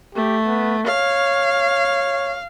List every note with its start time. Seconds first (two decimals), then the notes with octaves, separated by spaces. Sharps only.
0.15 A3 G4
0.46 B3
0.86 C#5 F5